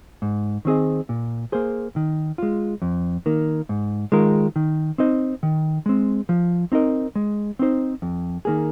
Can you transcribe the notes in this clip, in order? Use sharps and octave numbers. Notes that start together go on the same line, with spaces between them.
G#2
D#3 C4 G#4 D#5
A#2
A#3 G#4 C5
D#3
G#3 F4
F2
D#3 A#3
G#2
D#3 G#3 F4 A#4
D#3
C4 D#4 C5 D#5
D#3
G#3 C4
F3
C4 D#4 A#4 D#5
G#3
C4 D#4 C5
F2
D#3 A#3 G#4